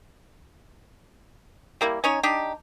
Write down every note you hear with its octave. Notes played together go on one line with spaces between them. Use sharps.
G3 A#3 E4
C#4 D#4 C#5
D4 D#4 G4